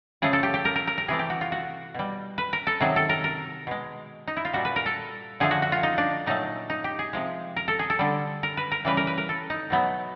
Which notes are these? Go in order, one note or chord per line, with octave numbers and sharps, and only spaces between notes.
C#3 F3 A3 G#4
A4
G4
G4
A#4
A#4
A#4
A#4
C3 E3 A3 G#4
G4
F#4
F4
F#4
B2 G3
B4
A#4
A4
C3 D#3 F#3 G#4
A4
A#4
A#4
B2 G#3
D#4
E4
F4
A#2 G3 F#4
B4
A#4
A4
D3 F3 A3 G#4
F#4
F#4
F4
D#4
D4
A#2 F#3 A3 D#4
D#4
G4
G#4
C3 F3 G#3
A#4
A4
G#4
A4
D3 G3
A#4
B4
A#4
C#3 E3 G3 B4
A#4
B4
A#4
A4
D#4
B2 F#3 A3 B3